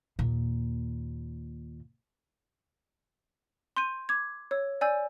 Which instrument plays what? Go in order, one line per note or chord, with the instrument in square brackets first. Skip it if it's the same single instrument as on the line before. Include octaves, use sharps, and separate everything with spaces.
[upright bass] D#2 A#2
[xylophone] C6 G6 D#7
D6 G#6
C#5 E6
D5 G#5 E6 G6